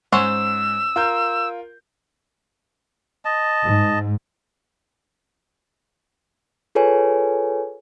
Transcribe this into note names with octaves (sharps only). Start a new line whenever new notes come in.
G#2 C#4 C5 F#5 E6
F4 A#4 G6
D#5 A5
G#2
F4 G#4 A4 B4 C#5 G#5